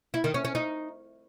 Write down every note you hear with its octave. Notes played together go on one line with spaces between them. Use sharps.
E4
D#3
C#4
C#4
D#4